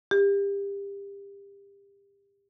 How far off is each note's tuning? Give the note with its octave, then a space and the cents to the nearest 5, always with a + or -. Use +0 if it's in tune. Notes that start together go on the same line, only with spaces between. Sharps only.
G4 +30